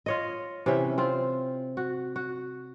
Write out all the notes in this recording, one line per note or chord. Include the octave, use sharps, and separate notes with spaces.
F4 C#5 D#5
C3 E3 C#4 E5
C4 F4
F#4
F#4